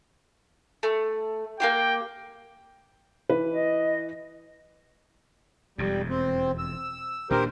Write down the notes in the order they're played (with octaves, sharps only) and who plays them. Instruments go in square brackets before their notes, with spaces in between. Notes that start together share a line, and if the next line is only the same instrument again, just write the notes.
[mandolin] A3
[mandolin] A#3 F4 G4 [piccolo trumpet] G5
[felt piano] E3 B4
[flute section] D#5
[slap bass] E1 F2 [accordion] G3
[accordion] C4
E6
[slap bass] D#1 A#2 D4 [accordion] G4 A#4 C5